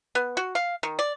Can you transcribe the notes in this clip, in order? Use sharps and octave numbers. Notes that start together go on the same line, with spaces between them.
B3
F#4
F5
D#3
D5